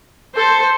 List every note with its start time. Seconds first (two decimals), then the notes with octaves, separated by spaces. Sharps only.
0.35 A4 C5